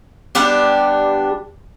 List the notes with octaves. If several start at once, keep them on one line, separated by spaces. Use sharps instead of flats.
G3 B3 D4 G4